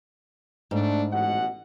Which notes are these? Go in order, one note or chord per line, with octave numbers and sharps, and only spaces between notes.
G#2 A3 D4
A1 B2 F#5